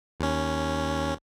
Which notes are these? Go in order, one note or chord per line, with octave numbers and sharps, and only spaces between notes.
D#2 C#4